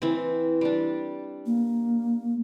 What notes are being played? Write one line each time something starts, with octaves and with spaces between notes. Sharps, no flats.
E3 C4
G3 D4
A#3